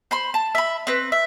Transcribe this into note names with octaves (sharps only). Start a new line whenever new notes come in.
C5 B5 C6
A5
E5 B5
C4 B4
E5